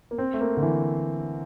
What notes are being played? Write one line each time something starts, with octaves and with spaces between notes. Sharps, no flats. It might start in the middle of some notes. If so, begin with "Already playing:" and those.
A#3
C4
A3
A#3
D3
E3